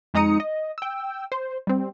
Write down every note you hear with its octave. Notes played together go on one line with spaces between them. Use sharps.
F2 G#3 D#4 A#5 D#6 C#7
D#5
G5 E6
C5
G3 C4